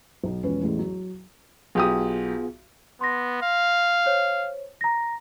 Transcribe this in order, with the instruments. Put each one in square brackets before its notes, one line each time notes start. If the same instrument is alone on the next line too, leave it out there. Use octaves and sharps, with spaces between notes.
[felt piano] B1
E1 F3 C#4 B4
A1 E2 A2
F#3
[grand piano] B1 G4 D#6 [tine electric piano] B3 F4 G#4
[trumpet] B3 [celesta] C6 A#6
[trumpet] F5
[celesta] C5 C#5
A#5 A#6